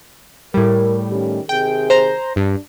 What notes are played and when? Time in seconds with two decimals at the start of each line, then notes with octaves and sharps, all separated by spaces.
0.54 A2 G3 A#4
1.10 D#3 C#4 G4
1.49 C3 D#3 G#4 G5
1.90 C5 A#5
2.36 G2 D4